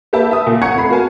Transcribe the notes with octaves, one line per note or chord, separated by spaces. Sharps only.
A#3 G4 B4 E5 A5
E5 A5 D#6
A#2
F#5 G#5 A#5 C#6 G#6 C#7
F2 A3 B5 C7
F#4 A#4 G#5 A5